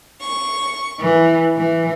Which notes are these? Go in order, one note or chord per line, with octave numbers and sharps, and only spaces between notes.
C#6
E3
E3